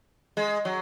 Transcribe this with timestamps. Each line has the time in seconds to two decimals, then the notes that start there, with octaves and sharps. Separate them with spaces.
0.37 G#3
0.65 F#3